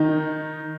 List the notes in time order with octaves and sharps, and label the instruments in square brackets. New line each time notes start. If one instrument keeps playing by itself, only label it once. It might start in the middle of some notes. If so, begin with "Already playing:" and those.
Already playing: [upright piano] D#3 D#4